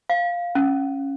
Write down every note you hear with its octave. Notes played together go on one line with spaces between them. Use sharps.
F5
C#4